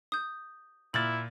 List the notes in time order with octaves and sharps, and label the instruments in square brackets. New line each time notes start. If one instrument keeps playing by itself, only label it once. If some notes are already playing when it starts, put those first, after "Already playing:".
[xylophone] D#6 G6
[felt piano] A#2 F6 A6 [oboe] E4 [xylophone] F#7